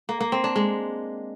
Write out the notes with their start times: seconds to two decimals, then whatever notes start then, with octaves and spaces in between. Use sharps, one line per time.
0.09 A#3
0.20 A#3
0.32 C4
0.44 D4
0.56 G#3